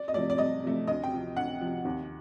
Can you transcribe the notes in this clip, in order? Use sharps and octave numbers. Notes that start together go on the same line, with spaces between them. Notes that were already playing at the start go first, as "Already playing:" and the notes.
Already playing: D5
D#5
C3 F3 A3 D5
D5
C2 D#5
C3 F3 A3
D2 D#5
G5
C3 F3
D2 F#5
C3 F3
D#2